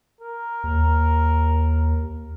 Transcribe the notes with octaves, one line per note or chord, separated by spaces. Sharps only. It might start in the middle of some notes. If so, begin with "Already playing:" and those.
A#4
D#2